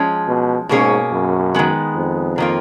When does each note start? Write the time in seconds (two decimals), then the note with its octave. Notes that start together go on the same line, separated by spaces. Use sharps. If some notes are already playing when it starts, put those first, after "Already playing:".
Already playing: F3 G#3 C#4
0.28 B2
0.69 G#2 B2 A#3 C#4 G#4 C#5
1.12 F#2
1.55 D#3 G#3 B3
1.95 F2
2.38 D#3 A#3 F4